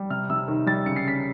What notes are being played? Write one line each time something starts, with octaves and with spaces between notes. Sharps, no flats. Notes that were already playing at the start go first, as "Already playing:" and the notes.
Already playing: G3
C3 F6
C3 E6
D#3
G3 A6
C#3 C#7
C7
C#3 B6